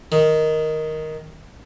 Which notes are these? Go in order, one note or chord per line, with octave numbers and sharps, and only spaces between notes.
D#3